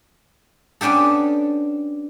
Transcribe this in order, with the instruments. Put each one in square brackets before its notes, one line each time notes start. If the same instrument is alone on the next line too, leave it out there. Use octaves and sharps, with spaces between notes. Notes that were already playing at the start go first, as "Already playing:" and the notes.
[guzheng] B3 C#4 D4 G4 A4